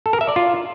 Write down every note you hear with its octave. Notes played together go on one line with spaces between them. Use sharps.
A4
A#4
E5
D5
F4